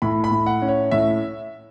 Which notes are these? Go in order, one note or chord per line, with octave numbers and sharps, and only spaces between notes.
A2 B5
B5
A2
F#5
C#4
C#5
A2 E5